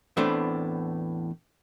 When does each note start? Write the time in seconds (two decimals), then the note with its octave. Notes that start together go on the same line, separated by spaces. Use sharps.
0.17 E2 A2 A3 B3 C4 D4